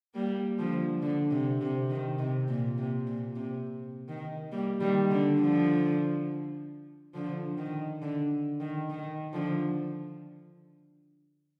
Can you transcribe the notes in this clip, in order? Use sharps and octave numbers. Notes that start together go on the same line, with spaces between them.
G3 A#3
D3 F3
D3
C3
C3
D#3
C3
A#2
C3
A#2
C3
D#3
G3 A#3
D#3 G3
D3
D3 F3
D3 F3
D#3
D3
D#3
D#3
D3 F3